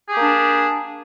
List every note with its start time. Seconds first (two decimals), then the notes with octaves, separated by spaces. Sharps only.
0.08 G#4
0.12 G4
0.16 A#3
0.20 D4